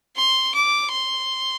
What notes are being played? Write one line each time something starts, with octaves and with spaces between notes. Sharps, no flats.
C6
D6
C6